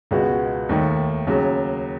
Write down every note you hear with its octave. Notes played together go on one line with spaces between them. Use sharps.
C#2 B2 G#3 B3 F#4
D#2 D#3 A3
D#2 C#3 F#3